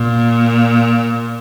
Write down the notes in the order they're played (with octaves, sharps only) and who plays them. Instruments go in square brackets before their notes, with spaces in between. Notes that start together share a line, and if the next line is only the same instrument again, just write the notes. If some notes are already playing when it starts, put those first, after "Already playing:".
Already playing: [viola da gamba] A#2